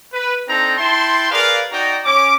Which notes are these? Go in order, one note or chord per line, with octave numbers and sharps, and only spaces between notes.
B4
C4 D4 D#4 A4 C5 A#5
E4 G5 A5 C6
G#4 A#4 B4 D5 F5
D#4 F#4 D5 G5 A#5
C#4 D6